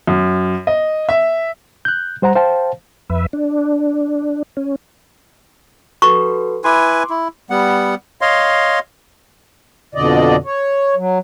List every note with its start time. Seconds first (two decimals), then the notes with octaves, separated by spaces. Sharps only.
0.07 F#2
0.67 D#5
1.09 E5
1.85 F#6 G6
2.22 G3 C5 F#5 A#5
2.35 C5 F5 G5 A5
3.10 F2 B4 E5
3.33 D4
4.57 C#4
6.02 F#4 A4 B4 C#6
6.64 E4 B4 G#5 C6 D6
7.10 E4
7.50 G3 B3 F#5
8.21 C#5 D#5 F5 C6
9.95 F2 B2 D3 D5 D#5
10.45 C#5
10.96 F#3